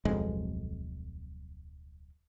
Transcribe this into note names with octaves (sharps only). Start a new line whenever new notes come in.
D1 B1 F2 G#3